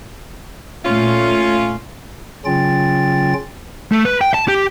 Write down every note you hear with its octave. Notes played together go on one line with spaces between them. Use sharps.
A#2 A3 C#4 F4
C#3 F#3 C#4 F4 G5 A6
A3
B4
G5
A5
G4